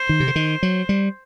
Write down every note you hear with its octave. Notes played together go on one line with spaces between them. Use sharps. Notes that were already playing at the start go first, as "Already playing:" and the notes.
Already playing: C5
D#3
C3
D3
D#3
F#3
G3